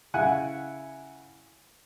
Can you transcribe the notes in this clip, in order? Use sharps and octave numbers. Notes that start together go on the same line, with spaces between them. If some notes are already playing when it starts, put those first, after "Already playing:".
C#3 E4 F#5 G#5